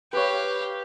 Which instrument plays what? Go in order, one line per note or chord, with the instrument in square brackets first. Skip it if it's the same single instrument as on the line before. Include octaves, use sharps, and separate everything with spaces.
[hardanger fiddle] G4 F5 [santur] B4 C#5